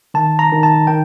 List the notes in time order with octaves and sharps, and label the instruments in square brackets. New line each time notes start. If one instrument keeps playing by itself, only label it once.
[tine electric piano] D#3 A5
A#5
D#3
A5
D#3 G5